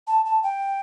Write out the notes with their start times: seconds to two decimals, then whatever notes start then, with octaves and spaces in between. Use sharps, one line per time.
0.07 A5
0.25 A5
0.43 G5